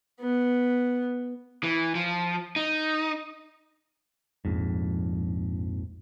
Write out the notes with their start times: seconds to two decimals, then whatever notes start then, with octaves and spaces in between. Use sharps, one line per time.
0.20 B3
1.63 E3
1.95 F3
2.56 D#4
4.45 A#1 F2 G#2